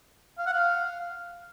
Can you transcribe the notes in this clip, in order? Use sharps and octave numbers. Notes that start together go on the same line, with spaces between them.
F5
F#5
F5